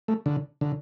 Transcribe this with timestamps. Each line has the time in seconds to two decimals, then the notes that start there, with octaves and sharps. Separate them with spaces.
0.08 A3
0.26 D3
0.61 D3